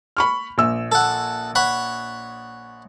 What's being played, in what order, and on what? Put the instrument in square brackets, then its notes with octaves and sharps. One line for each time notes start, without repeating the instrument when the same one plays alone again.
[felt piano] B5 C#6 F6
A#1 E6
[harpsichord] A4 F#5
C#5 F#5 B5